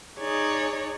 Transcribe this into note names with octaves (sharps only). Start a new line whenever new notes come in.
D#4 G#4 C#5 D5